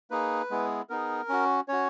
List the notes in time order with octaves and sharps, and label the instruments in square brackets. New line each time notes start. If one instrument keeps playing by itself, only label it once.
[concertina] A#3 D#4 G#4 B4
G#3 B3 E4 G#4
B3 D#4 G#4 A#4
C#4 F#4
C#4 F#4 C#5